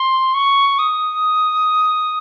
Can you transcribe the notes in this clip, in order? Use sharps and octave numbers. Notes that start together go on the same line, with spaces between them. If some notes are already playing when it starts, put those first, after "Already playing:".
Already playing: C6
C#6
D#6